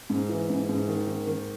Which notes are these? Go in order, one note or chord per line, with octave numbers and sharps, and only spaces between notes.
G#2
E3
G#2
G#2
D#3
D#3
D#3